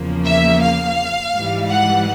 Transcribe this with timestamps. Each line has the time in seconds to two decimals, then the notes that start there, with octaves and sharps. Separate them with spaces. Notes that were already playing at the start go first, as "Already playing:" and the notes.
Already playing: E2 C#3 F3 A#3
0.25 E5
0.62 F5
1.34 G#2 E3 G3
1.70 F#5